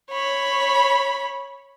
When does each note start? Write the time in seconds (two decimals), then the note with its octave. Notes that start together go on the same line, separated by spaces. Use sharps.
0.11 C#5 B5